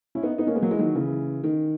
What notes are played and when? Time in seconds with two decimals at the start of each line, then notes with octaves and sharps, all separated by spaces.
0.15 C#4 E4
0.23 B3 D#4
0.38 B3 D#4
0.47 A#3 C#4
0.55 G#3 B3
0.62 F#3 A#3
0.71 E3 G#3
0.79 D#3 F#3
0.95 C#3 E3
1.44 D#3